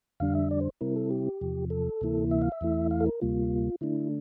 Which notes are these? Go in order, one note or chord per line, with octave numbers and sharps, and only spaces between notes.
F2 D3 G3 D4 F5
E5
D5
C5
C3 G3 C4 E4 A#4
A4
G4
E2 C3 F3
A4
D2 C3 E3 A#3 E4
E5
F5
E5
E2 E3 A3 E4
F5
A4
A#4
D2 C3 G3 A#3 F4
D3 A3 D4 E4